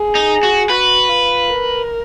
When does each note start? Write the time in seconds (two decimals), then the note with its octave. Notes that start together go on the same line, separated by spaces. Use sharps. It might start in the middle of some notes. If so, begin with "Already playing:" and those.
Already playing: G#4
0.15 D#4
0.43 F#4
0.70 F#4 B4
1.09 F4
1.49 A#4